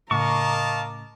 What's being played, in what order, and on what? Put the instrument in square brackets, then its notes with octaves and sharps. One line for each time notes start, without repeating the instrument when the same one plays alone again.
[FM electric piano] A2 C#3 D6 [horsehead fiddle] A#4 [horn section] D#5 F5 A5 [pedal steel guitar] C#6